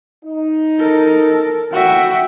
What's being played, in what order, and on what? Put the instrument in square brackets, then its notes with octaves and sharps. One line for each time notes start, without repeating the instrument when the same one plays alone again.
[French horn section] D#4
[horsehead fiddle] A4 A#4
[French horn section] A2 D3 [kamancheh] F#4 [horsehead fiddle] E5 G5